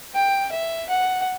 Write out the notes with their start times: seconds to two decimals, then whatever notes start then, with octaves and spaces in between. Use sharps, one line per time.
0.14 G5
0.52 E5
0.89 F#5